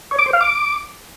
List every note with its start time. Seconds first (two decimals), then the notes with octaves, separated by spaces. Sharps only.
0.11 C#5
0.19 D6
0.26 C5
0.33 F5
0.41 D6